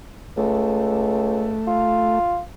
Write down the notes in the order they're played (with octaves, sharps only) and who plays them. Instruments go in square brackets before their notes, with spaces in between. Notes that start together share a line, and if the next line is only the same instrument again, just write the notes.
[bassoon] C#2 [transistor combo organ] A3
[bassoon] F4